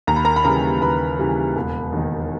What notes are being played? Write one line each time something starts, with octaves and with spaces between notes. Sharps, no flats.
D#2 A#5
B5
A#4 A#5
B5
C#3 E3 G3 A#4 A#5
D#2 B4 B5
C#3 E3 G3
E1
D#2 D#3